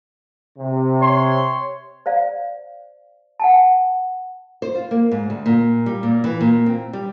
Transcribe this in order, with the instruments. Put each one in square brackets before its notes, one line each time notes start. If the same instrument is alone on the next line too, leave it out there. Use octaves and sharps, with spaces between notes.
[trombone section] C3
[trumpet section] C#5 C6
[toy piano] C5 D5 F5
F#5 G#5 A5
[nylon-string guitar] C5
F4
A#3
G#2
D2
A#2
G3
A#2
E3
A#2
C4
G3